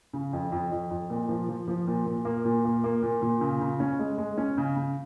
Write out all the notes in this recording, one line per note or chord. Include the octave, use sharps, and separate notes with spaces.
C#3
F2
F2
F2
F2
A#2
F3
F3
F3
A#2
A#2
A#3
A#2
A#3
A#3
A#2
A#2
C#3
C#3
C#4
G#3
G#3
C#4
C#3
C#3